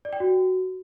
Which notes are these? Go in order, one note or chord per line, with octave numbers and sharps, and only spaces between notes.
D5
G5
F#4